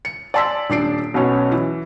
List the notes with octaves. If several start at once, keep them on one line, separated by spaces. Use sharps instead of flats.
C#7
D5 G#5 A5 C6 E6 B6
D#1 D4 C7 D7
B1 B3 C#4 C#5
E3